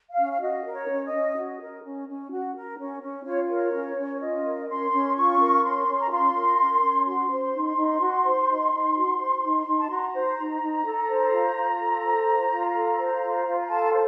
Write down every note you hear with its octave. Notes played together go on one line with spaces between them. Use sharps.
F5
C#4
F5
F#4 D#5
A#4
C#5
C#4
D#5
C#4
F#4
A#4
C#4
C#4
F#4
A#4
C#4
C#4
F4 C#5
A#4 C#5
C#4
C#4
F4 D#5
A#4
C#4 C6
C#4
F4 C#6
A#4
C#4 C6
C#4
A#5
F4 C6
A#4
C#4
C#4
F#4 C6
C5
D#4
D#4
F#4
C5
D#4
D#4
F#4
C5
D#4
D#4
A5
F#4 A#5
C5
D#4
D#4
A4
C5
F4
F4
A4
C5
F4
F4
A4
C5
F4
F4
A4 A5
C5